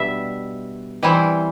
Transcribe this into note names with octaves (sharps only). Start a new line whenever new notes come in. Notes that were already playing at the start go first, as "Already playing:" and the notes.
Already playing: B2 G3 D4 E5
E3 G3 C4 E4